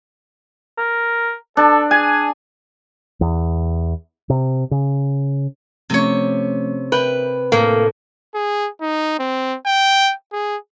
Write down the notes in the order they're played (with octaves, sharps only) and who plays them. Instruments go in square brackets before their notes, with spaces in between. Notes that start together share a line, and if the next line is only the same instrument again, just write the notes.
[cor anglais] A#4
[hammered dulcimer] D4 [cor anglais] A4
[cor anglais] G#4 [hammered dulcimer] G#5
[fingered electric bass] E2
C3
C#3
[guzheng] C3 C#5 [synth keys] F3 A3 C#4
[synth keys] A#4 E5 [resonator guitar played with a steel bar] B4 [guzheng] G5
[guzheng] A2 [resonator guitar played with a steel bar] A#3 [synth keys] C#7
[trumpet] G#4
D#4
C4
G5
G#4